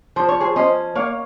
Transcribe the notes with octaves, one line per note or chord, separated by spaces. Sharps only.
F3 C5
C#5
G#4 C5
C#4 C5 D#5
A#3 C#5 F5